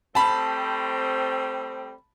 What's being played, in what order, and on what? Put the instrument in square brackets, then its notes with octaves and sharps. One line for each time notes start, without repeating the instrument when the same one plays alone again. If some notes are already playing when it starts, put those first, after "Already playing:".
[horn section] G3 A3 C4 [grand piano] A5 B5